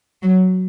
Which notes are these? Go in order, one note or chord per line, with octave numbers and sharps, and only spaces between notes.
F#3